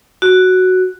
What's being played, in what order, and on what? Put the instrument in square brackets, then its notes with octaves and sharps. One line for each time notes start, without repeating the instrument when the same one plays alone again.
[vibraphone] F#4